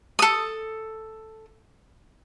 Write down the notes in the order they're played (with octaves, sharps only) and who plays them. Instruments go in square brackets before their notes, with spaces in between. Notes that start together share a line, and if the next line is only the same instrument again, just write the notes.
[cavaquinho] A4 D#6